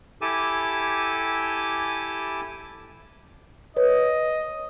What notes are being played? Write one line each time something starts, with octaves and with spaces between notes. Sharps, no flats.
E4 G4 A4 G#5 D6 E6
B4 C#5 D#5